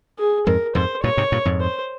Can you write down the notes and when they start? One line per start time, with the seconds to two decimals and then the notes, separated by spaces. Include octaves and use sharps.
0.18 G#4
0.47 F2 G#2 A#4
0.75 F2 G#2 C5
1.03 G2 A#2 C#5
1.17 G#2 C3
1.32 G2 A#2
1.45 F2 G#2
1.61 C5